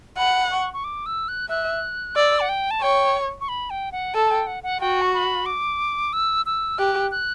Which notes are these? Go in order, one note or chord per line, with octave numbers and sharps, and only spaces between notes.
F#5 B5
C#6
C#6
D6
E6
F#6
E5 F#6
D5 E6
F#5
G5
A5
C#5 G5
C#6
B5
G5
F#5
A4 A5
A5
G5
F#5
F#5
F#4 G5
C#6
B5
D6
E6
E6
G4 F#6
F#6